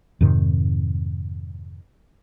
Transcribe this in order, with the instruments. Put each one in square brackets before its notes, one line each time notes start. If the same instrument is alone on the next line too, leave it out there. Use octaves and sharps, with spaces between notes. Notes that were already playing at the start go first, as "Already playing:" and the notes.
[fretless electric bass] F2 G#2 C3 D#3